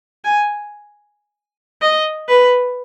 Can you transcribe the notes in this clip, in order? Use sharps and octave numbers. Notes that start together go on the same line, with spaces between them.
G#5
D#5
B4